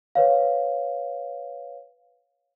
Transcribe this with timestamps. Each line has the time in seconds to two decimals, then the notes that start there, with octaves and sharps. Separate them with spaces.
0.15 B4 C#5 F5